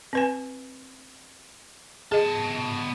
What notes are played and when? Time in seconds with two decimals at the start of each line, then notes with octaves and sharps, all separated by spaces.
0.13 C4 B4 G#5
2.12 B3 G#4 D#5 A5